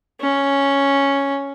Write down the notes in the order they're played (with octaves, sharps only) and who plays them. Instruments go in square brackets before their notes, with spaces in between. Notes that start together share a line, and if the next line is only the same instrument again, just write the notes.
[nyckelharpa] C#4